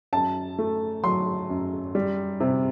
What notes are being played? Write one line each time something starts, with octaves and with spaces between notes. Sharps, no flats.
F#2 A5
A3
F#3 C6
F#2
G3
C3